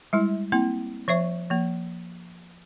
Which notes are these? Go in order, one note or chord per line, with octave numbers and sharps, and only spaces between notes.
G3 G#3 E4
A#3 C4 E4
F3 C5 E5 C#6
F3 A#3